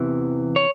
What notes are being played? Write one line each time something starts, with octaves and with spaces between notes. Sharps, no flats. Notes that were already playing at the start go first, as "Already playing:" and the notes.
Already playing: E2 C3 E3
C#5